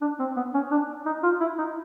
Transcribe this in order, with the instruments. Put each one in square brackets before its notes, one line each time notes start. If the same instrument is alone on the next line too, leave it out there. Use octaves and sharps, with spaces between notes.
[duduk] D4
C4
B3
C#4
D4
D#4
F4
E4
D#4